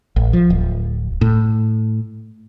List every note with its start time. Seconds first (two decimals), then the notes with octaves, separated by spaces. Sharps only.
0.16 A1
0.33 F3
0.50 D1
1.21 A2